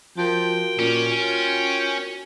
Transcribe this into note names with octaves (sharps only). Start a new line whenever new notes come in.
F3 F#4 A#4 G5
A#2 C#4
F4